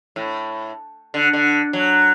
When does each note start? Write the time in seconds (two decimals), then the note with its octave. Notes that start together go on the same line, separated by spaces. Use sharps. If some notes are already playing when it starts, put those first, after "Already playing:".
0.16 A2
1.14 D3
1.33 D3
1.73 F#3